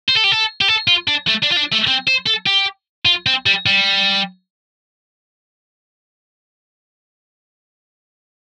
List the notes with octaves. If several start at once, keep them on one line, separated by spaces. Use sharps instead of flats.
C5
A4
G4
A4
G4
A4
F4
D4
A3
D4
F4
D4
A3
C4
C5
A4
G4
F4
C4
G3
G3